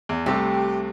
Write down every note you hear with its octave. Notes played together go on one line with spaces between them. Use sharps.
E2
C2 C3 A3 G4